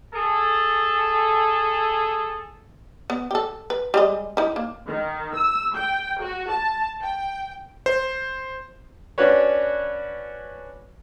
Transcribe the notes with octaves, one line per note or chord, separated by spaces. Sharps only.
G#4 A4
B3
G4 A4
B4
G3 G#3 D#5
D#4 E4
A#3
D#3
E6
G5
F#4
A5
G5
C5
C#4 D4 F#4 B4 C#5